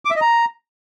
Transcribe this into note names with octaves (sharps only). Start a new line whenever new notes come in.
D6
E5
D#5
A#5